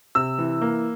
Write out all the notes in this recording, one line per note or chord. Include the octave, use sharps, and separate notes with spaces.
C3 E6
E3
A#3